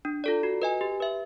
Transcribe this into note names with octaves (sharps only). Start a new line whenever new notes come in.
D4
F4 A4 D5
F#4
B4 D#5 G#5
G4
B4 E5